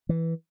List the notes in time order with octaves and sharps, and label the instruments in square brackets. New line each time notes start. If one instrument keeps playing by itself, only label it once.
[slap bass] E3